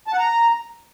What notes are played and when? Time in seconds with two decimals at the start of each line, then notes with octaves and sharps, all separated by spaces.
0.07 A5
0.13 F#5
0.18 A#5